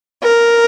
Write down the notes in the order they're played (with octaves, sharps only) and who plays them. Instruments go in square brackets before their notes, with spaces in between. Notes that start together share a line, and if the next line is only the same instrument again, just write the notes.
[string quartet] A#4